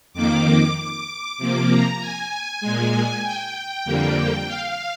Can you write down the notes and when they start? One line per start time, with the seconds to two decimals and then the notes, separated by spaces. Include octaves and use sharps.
0.13 F2 D#3 A#3 D6
0.76 D6
1.37 C3 F3 A#3 D6
1.69 A#5
2.00 G#5
2.61 A#2 G#3
3.23 G5
3.85 F2 D3 G3 A#3
4.47 F5